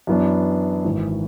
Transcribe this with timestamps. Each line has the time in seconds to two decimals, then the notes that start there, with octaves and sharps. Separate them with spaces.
0.07 F#2 E3 B3 D4
0.84 G#1 G#2 E3